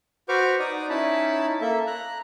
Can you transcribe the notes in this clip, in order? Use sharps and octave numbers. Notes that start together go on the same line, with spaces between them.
F#4 B4 C5 C#6 D6 F6
D#4 D5 D#6
C#4 D#4 E4 A5 B5
A#3 A4 E5
A#5 F#6